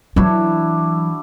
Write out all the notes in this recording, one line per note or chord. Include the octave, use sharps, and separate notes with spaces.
E3 F#3 D4 E4 F#4